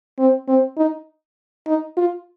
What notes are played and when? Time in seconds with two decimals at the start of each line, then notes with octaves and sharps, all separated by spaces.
0.19 C4
0.48 C4
0.77 D#4
1.67 D#4
1.97 F4